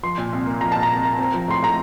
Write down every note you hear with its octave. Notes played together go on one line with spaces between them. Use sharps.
F3 C6
A#2
C2
A#3
F3 A#5
A#2 A5
A#5
C2
A#3
C4
F3
A2 C6
A2 A#5